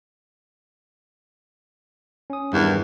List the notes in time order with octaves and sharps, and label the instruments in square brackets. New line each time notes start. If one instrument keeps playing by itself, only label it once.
[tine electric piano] C#4 D#6
[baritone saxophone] E2 [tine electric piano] G2 D#3